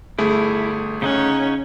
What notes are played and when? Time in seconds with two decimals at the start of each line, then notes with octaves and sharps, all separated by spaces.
0.19 G1 A3 E4 G#4
1.02 C#3 C#4 D#4 F#5